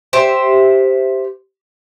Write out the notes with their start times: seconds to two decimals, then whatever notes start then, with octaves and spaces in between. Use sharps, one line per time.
0.13 G4 C5 E5